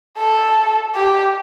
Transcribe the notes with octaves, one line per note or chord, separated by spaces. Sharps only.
A4
G4